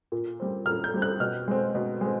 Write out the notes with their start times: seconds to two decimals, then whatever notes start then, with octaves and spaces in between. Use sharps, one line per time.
0.12 A#2
0.40 G3 C4
0.66 A#2 F6
0.84 G6
0.94 G3 C4
1.02 F#6
1.20 B2 F6
1.48 G#3 C4
1.75 B2
2.01 G#3 C4